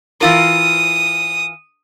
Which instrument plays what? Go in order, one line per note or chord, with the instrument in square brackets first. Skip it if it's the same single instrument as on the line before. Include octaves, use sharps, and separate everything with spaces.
[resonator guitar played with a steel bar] E3 F4 A#4 [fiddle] D#6